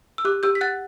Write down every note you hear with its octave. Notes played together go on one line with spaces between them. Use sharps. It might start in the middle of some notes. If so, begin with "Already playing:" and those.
E6
G4 D6 F#6
G4 E6 G6
B6
F#5 F#6 A6